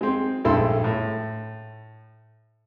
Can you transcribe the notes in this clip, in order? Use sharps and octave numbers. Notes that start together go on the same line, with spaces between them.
G#3 C4
A#1 G2 G#3 E4 A4 C6
A2